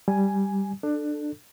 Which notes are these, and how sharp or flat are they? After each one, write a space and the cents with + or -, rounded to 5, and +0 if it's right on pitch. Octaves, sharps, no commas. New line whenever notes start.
G3 +0 G#5 +5
D4 +20 A4 +0